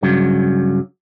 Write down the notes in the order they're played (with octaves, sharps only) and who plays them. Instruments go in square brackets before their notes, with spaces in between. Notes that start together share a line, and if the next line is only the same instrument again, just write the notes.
[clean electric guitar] G2 C#3 F#3